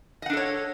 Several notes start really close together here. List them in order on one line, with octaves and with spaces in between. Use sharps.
D#5 F#5 D4 A4 C#5